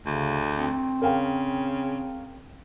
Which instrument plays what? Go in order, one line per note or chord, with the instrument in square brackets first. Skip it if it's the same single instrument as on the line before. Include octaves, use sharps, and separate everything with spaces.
[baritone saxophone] D2 [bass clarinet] C#3
[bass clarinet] C4
[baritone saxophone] C#3 [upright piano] A#4 F5 G5